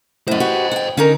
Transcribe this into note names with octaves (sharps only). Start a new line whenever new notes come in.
F#2 A2 C5 D#5
F#4 G4 B4
F#5 G5
D3 C#4 D#4 A#4